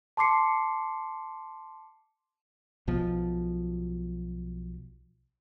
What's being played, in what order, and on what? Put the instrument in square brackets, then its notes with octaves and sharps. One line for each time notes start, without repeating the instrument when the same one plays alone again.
[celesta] A5 C6 D6 C7 C#7
[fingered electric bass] B1 B2 F3